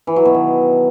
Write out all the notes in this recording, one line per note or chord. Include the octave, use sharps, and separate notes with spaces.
E3
F#3
B2
D#3